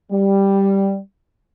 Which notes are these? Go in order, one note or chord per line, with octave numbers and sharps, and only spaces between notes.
G3